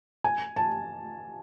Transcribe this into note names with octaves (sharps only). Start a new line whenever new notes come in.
G#5
A5